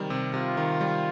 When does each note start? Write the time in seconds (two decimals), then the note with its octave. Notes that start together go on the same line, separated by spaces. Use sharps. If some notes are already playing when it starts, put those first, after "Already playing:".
Already playing: C3 D#3 G3
0.10 C3
0.34 C3 F4
0.57 D#3
0.81 G3